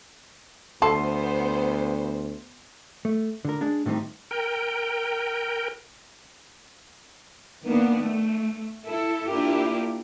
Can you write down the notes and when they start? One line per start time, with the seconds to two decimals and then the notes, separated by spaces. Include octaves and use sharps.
0.82 D2 B3 A4 C5 C6
3.05 A3
3.45 D3 A#4
3.61 G#3 D4
3.86 A2 D#3 G3 C4 D#4
4.31 A#4 G5
7.65 D#3 A#3 B3 D4
8.02 A3
8.85 E4 A4
9.29 A#3 D4 E4 F4 G4 A#4